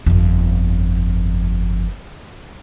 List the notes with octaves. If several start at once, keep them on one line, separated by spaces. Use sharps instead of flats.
G1 F2